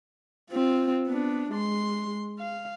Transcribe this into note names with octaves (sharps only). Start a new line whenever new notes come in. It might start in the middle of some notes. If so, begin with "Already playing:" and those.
C4 F4
B3 D4
G#3 C6
F5